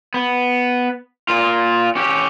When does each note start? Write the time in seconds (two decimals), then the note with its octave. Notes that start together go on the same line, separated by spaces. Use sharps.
0.14 B3
1.29 A#2 F4
1.96 C#4 G4